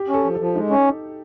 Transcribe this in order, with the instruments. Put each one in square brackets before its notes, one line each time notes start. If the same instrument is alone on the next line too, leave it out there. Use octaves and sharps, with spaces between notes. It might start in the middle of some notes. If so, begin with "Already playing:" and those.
Already playing: [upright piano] G4
[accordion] C#4 [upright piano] A4
[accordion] F3
[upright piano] A4
[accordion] F3
[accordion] G#3 [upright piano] D#4
[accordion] C#4